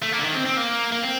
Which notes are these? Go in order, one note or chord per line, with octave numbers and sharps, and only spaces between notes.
A3
A#3
D3
D#3
C4
C4
A#3
A#3
C4